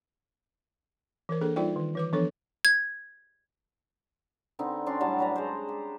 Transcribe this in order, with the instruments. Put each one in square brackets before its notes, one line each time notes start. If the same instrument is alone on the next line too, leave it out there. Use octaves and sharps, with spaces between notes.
[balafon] E3 A#4 C5
A#3 D4 G#4 A4 C5
G3 D#4 F4 C5 D5 G5
D#3
E3 B4 D6
E3 F3 B3 D4 A4 C#5
[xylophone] G#6
[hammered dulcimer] D3 C4 D#4 B4
C#4 D4 F#4 C6
A2 F#3 G3 A5
F#3 B4 A#5
G#3 C5
G4